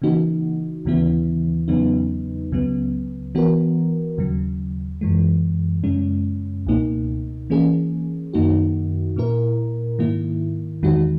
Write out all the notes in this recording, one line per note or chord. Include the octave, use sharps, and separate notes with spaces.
C#3 E3 A#3 D#4 F#4
D#2 C#3 E3 B3 E4
E2 C#3 F#3 B3 D#4
C#2 C#3 F#3 B3
E3 B3 F#4 A#4
D#2 C#3 F#3
F#2 E3 G#3
F#2 C#3 G#3 C#4
C#2 B2 A#3 D#4
E3 A#3 C#4 G#4
F#2 D#3 A#3 D#4 F#4
A#2 A#3 E4 A#4
G#2 D#3 A#3 E4
E2 D#3 G#3 D#4 F#4